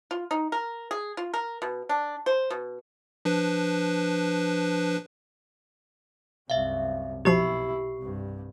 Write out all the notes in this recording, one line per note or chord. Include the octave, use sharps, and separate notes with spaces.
F4
D#4
A#4
G#4
F4
A#4
B2
D4
C5
B2
F3 D4 B4
C2 F#2 E5 F5
B1 B2 F3 E4 G4 C#6 C7
C2 G2